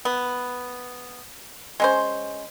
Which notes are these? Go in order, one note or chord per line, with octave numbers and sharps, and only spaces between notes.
B3
G#3 C#4 C5